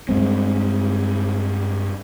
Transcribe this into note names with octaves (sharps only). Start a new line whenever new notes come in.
G2 G#3 C4